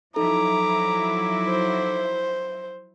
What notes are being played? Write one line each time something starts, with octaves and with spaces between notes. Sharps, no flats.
F3 F#3 D#4 E4 A4 A#5 D6
C5